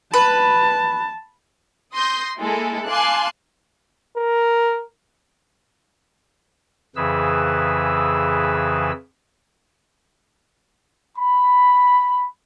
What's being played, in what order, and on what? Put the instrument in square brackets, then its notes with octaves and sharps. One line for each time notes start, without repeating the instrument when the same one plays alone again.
[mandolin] B4 [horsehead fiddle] A5
[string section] C6 D#6 G6 A#6
G#3 A#3 E4 A4
F5 G#5 A5 C6 D6 F#6
[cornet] A#4
[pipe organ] F2 C#3 E3 G#4 B4 E6
[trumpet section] B5